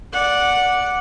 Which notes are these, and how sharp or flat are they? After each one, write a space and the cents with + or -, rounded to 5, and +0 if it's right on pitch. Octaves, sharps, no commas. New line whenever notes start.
D5 -5 F#5 -10